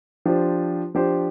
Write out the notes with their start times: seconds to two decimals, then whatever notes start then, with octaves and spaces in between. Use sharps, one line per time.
0.25 F3 D4 G4 C5
0.95 F3 D4 G4 C5